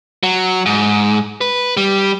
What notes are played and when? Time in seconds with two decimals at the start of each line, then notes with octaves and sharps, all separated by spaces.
0.23 F#3
0.66 G#2
1.41 B4
1.77 G3